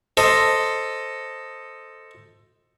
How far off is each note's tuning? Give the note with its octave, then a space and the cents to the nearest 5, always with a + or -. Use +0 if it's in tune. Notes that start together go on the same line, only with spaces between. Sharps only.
A4 +10 C5 +0 D#5 +0